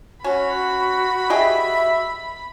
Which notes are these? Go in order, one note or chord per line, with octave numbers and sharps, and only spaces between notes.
C#4 F#4 B5
G4 G#4 D#5 E5